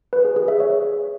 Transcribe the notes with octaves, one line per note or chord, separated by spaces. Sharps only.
B4
G#4
G#4
E5
C#5